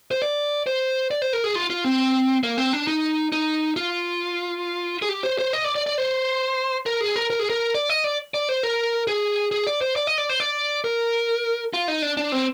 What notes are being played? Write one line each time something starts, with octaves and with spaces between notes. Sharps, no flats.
C5
D5
C5
D5
C5
A#4
G#4
F4
F4
C4
A#3
C4
D4
D#4
D#4
F4
G#4
G4
C5
C5
D#5
D5
D5
D5
C5
A#4
G#4
A#4
A#4
G#4
A#4
D5
D#5
D5
D5
C5
A#4
G#4
G#4
D5
C5
D5
D#5
D5
C5
D5
A#4
F4
D#4
D4
D4
C4